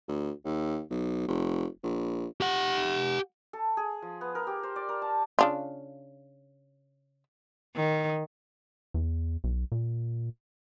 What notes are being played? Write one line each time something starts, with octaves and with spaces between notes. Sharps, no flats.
D2
D#2
B1
F1
A#1
G4 F#5
A4
G#4
F3
B3
A#4
G4
C5
D5
A#4
A5
C#3 D4 F4
D#3
E2
B1
A#2